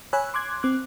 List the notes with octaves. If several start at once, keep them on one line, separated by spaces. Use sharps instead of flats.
C#5 G#5 B5 E6 F#6
C6 D6 F#6 G#6
C4 D6 F#6